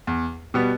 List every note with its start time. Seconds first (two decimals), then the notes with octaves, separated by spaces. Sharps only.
0.07 E2
0.54 B2 G3 B3